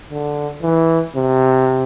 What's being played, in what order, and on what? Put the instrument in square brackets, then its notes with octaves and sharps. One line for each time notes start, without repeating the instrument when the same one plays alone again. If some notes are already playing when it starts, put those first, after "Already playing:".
[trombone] D3
E3
C3